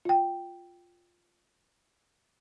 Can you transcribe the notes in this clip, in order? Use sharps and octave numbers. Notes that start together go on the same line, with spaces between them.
F4 G5